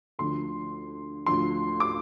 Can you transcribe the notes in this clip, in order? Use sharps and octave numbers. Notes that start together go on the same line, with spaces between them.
D2 D3 F3 C6
D2 D3 F3 C6
D6